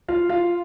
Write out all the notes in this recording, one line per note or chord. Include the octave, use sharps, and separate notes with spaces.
F4 F5
F4 F5